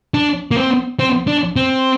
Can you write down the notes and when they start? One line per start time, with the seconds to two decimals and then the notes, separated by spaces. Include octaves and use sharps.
0.14 D4
0.51 A#3
0.56 C4
0.99 C4
1.28 D4
1.56 C4